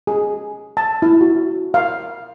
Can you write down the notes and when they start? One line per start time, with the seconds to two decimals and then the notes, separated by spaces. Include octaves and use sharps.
0.07 G#4
0.77 A5
1.02 E4
1.21 F#4
1.74 F5